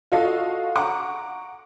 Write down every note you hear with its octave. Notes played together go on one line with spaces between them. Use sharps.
F4 F#4 A4 D#5 F5
F#5 A#5 C#6 D6